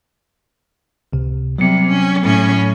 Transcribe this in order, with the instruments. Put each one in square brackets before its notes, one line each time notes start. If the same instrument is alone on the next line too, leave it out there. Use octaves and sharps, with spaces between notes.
[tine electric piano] C#2 C3
[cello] C3 G3 [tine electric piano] F#3 C#7
[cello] C#4
A2 C#4